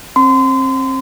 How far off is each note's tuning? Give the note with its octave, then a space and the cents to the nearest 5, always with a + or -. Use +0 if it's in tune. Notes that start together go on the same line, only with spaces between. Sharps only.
C4 +35 C6 -30